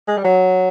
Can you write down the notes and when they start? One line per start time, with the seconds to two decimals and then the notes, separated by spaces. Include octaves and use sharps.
0.08 G#3
0.17 G3
0.25 F#3